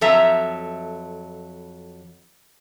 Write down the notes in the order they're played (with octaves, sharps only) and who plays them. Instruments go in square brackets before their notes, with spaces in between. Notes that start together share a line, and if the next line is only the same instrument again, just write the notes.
[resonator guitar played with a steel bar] F2 F#3 A4 E5 A#5